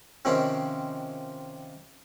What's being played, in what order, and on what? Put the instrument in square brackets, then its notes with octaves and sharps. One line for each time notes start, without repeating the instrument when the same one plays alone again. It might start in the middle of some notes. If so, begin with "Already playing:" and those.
[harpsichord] C3 D#3 F3 C4 C#4